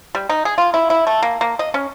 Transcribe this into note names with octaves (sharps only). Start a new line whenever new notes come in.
G3
D#4
G#4
F4
E4
E4
A3
A#3
A#3
D#5
C#4